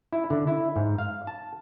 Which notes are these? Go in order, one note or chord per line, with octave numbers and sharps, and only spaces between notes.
E4
D3
E4
G#2
F5
A5